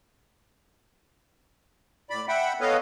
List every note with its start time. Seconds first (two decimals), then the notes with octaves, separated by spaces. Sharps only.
2.10 A2 D5 B5
2.28 E5 F#5 G5 B5
2.61 B3 A4 B4 C#5 D#5 F5